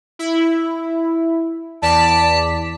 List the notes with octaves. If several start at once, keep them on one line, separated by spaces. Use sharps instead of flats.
E4
E2 D5 A5 B6